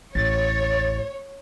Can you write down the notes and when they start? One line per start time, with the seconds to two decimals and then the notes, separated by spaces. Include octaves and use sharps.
0.15 A1 E2 C#5 A6